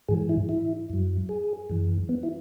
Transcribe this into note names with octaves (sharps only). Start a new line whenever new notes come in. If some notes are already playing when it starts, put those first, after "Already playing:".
G#2 E3 G#4
E4
E4
F#2 F#3
G#4
F#2 E3
B3
E4